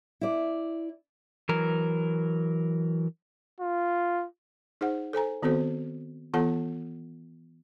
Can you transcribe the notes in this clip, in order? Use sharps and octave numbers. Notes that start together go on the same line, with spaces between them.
E4 D5
E3 F#3 A#4
F4
D#4 G#4 C5 F#5
A4 C5 G#5 A#5
D#3 B3 C4 F#4 A4 C5
E3 B3 F4 A4 F#5 A5